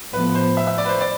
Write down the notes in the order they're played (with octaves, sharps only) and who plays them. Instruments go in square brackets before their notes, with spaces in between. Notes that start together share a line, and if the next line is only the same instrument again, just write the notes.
[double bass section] A2 F3 B3 [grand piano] B4
[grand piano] C5
E5
E5
D5
B4
C5
D5